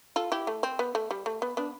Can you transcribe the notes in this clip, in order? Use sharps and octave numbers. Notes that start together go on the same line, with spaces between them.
F4 A4
E4 G4
A3
C4
B3
A3
G3
A3
B3
B3 D4